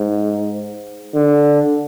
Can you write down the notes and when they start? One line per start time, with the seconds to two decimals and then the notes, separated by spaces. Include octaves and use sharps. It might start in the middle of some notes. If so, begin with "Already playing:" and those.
Already playing: G#2
1.15 D3